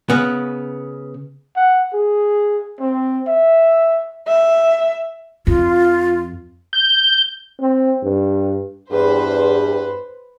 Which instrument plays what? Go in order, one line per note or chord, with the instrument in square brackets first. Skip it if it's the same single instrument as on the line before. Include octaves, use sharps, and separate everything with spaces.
[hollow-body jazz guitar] C#3 B3
[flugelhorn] F#5
G#4
C4
E5
[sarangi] E5
[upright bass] F2 [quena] F4
[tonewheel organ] G6
[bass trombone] C4
G2
[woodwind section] E2 G2 [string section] B4 C5